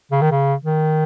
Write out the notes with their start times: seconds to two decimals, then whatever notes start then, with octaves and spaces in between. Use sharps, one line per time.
0.12 C#3
0.22 D#3
0.31 C#3
0.64 D#3